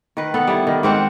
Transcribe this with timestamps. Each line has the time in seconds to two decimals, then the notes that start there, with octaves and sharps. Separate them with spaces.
0.17 D#3 B4
0.34 B3 A4 F#5
0.47 G3 E4
0.67 D#3
0.83 G#2 C4 F#5